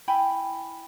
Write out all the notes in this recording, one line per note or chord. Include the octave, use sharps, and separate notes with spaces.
E4 G5 G#5 B5